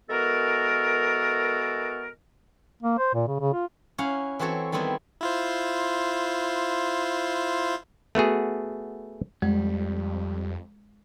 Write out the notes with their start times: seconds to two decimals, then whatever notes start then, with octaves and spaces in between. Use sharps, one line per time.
0.10 E3 G#3 B3 F#4 A4 A#4
2.83 A#3
2.98 C5
3.14 A#2
3.28 C#3
3.40 C#3
3.53 F4
3.98 C#4 E4 F5 F#5
4.39 E3 C4 F#4 A4 C#5
4.72 D#3 G3 B3 C4 E4
5.21 E4 F4 C5
8.15 A3 B3 F#4 G#4
9.42 F2 G3 G#3